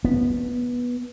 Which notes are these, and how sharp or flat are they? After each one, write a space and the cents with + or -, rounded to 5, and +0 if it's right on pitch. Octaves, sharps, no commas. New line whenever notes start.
B3 -15